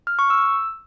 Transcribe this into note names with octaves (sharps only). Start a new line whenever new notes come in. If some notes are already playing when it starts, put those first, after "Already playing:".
F6
C#6
E6